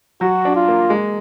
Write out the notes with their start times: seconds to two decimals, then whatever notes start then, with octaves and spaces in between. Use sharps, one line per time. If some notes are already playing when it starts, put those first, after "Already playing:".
0.21 F#3 F#4
0.45 D4
0.56 F4
0.68 A#3
0.90 G#3